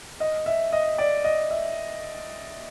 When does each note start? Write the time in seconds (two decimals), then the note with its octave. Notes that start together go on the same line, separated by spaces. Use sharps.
0.20 D#5
0.46 E5
0.73 D#5
0.98 D5
1.24 D#5
1.50 E5